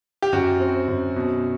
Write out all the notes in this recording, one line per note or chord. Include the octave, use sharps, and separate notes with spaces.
G4
F#2 F#4
C4
F#2
B2